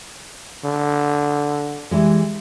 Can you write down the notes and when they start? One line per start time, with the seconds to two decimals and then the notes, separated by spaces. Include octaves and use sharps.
0.65 D3
1.91 E3 G3 G#3